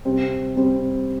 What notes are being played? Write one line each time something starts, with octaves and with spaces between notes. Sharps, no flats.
C3 G3 C4
C3 G3 C4